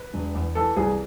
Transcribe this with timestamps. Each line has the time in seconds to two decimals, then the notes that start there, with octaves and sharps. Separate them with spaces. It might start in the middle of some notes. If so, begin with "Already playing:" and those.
Already playing: B4
0.13 E1
0.35 E2
0.55 E3 A4
0.76 C2 G#4